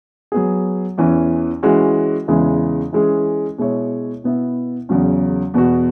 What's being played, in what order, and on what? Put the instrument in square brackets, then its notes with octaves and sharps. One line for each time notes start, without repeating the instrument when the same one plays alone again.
[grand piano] F#3 B3 G#4
E2 E3 C#4
E3 G#3 C#4 F#4
E2 C#3 E3 G#3
E3 G#3 C#4 G#4
B2 G#3 E4 C#5
B2 B3 E4
E2 C#3 F#3 C#4
E2 B2 B3 F#4